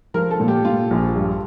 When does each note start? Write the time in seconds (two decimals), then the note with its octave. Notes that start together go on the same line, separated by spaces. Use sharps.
0.14 F3 A#4
0.31 A4
0.40 A#2
0.48 G4
0.65 A#2 F4
0.91 A#1
1.15 G2